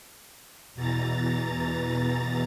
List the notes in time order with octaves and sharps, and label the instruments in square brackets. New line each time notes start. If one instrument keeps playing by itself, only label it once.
[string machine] E2 B2 E3 A#5 A6